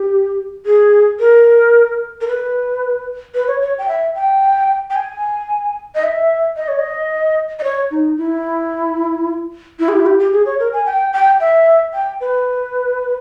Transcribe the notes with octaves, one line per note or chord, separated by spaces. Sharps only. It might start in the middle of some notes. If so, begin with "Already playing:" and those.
Already playing: G4
G#4
A#4
A#4
B4
B4
C#5
C#5
G5
E5
G5
G5
G#5
D#5
E5
D#5
C#5
D#5
D#5
C#5
D#4
E4
E4
G#4
G4
E4
G4
G4
G#4
C#5
A#4
G#5
G5
G5
E5
G5
B4